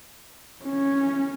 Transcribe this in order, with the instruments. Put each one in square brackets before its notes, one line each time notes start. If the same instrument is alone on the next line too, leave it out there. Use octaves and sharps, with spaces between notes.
[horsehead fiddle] C#4